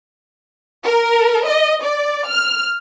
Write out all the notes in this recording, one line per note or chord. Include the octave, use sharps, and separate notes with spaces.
A#4
D#5
D5
F6